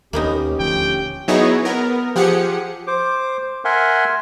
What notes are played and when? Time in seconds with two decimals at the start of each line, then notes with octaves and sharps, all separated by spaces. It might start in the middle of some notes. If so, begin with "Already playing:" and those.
0.13 D#2 A#3 B3 C#4 D#4 G4
0.60 D#1 D2 F3 G5
1.28 F#3 B3 D#4 E4 G#4 C#5
1.65 B3 A#4
2.16 F3 G4 G#4 F#5 C#7
2.87 C5 D6
3.65 A#4 E5 F#5 G#5 C6